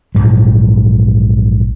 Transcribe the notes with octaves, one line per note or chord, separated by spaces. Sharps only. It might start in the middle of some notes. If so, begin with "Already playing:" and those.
A#1 G#2 F#3